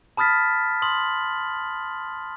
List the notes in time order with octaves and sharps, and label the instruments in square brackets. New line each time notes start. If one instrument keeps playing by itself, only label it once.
[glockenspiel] A5 B5 D#6 F6 A6 B6
C6 D#6 F#7